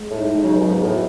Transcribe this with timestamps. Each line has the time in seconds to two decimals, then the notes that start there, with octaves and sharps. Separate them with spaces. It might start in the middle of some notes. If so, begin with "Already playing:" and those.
Already playing: G#3
0.10 A2
0.18 D#4
0.43 C#3 F#3
0.57 B2
0.69 G#2 B3
0.82 A2